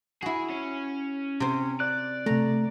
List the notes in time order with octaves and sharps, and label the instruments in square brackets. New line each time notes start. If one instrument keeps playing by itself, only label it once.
[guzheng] E4 F#4 [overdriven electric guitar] G#4
[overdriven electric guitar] C#4
[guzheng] C3 C5
[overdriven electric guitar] D5 [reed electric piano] F#6
[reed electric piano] C3 A3 [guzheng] A#5